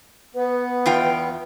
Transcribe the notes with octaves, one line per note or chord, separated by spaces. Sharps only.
B3 B4
E2 F4 G5